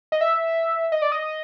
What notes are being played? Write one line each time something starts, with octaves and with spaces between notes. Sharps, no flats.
D#5
E5
D#5
D5
D#5